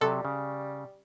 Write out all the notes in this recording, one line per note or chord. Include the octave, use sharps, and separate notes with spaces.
C3 F#3 G3 A4
C#3